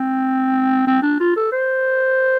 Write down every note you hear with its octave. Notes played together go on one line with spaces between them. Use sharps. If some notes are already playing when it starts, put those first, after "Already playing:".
Already playing: C4
C4
D4
F4
A4
C5